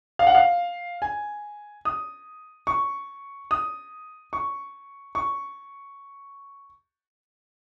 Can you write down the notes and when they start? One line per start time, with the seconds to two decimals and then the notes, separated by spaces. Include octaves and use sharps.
0.19 F5
0.27 F#5
0.35 F5
1.02 G#5
1.85 D#6
2.67 C#6
3.51 D#6
4.33 C#6
5.15 C#6